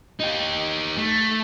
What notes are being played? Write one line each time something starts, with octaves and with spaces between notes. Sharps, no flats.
D#4 G4
A3